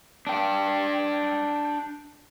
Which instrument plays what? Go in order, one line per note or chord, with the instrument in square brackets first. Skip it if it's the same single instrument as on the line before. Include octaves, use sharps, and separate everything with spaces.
[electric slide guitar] D4 G5